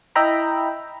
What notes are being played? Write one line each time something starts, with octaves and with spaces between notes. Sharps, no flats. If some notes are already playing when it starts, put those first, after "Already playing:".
E4 D#5 E5 G5 A#5 B5